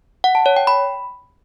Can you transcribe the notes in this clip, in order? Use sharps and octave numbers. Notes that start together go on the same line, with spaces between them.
F#5
A5
C#5
G5
B5